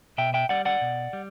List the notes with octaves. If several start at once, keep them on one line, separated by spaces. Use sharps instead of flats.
B2 E5 G5
E5 G5
G3 D5 F#5
D5 F#5
B2
G3